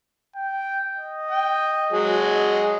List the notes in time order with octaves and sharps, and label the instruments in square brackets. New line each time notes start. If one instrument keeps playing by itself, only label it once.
[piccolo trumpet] G5
D#5
[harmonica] G5
F#3 G#3 G#4
[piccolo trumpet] D#5